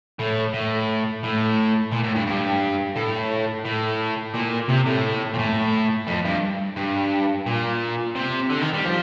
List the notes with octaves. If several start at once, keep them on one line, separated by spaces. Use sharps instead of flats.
A2
A2
A2
A#2
A2
G2
G2
A2
A2
A#2
C3
A2
A#2
A2
F2
G2
G2
A#2
C3
D3
D#3
G3
F3